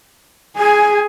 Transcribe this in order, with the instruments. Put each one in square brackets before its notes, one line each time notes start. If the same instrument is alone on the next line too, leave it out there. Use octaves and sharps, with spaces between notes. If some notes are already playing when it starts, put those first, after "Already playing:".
[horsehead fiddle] G#4 [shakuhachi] G#5